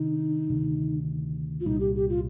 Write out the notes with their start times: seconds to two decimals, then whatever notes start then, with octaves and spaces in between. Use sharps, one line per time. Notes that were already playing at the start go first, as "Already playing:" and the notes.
Already playing: C3 D#3 D4 D#4
0.50 D2 C3 D#3
1.60 F4
1.65 C2 A#2 G3 D#4
1.80 G4
1.95 G4
2.09 F4